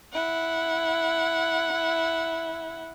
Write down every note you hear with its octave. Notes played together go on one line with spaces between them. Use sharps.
E4 F#5